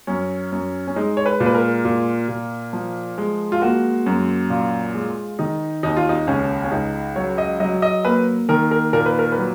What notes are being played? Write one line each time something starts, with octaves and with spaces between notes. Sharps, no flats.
F#2 C#4
F#2
C#4
G#3 D#4
C#5
B4
A#2
B4
A#4
A#2
A#2
F3
G#3
F4
A#3 F#4
F#2
A#2 F4
G#3
D#3 D#4
D#2 D#4
F4
D#4
C#2 C#4
C#4
C#2 D#4
F#3 C#5
D#5
F#3 D#5
D#5
A#3 B4
D#3 A#4
A#4
A#2 A#4
B4
A#4
B4
F#3